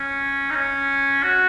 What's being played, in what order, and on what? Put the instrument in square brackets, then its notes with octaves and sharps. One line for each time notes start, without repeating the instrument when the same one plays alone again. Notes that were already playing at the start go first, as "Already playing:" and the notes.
Already playing: [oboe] C#4
D#4
C#4
F#4